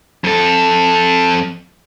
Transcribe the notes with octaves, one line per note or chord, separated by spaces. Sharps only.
F2 A4